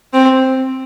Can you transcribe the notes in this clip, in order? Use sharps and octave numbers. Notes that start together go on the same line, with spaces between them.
C4